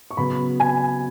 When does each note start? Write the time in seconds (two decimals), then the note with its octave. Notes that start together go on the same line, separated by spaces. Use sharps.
0.11 C#6
0.17 C#3 F#3 B3 B5
0.60 G#5